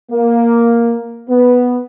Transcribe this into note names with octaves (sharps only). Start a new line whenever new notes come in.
A#3
B3